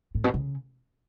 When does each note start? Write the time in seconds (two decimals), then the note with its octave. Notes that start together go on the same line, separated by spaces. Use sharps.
0.15 A2
0.24 B2
0.34 C#3